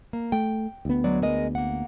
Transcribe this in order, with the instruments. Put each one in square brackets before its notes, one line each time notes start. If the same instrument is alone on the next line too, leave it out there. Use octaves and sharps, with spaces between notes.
[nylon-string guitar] A#3
[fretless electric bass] A3 [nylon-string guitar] G5
[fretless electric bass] D2 B3
[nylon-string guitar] F#3 G#3 D5
G#3 A#4 D#5
A#3 F#5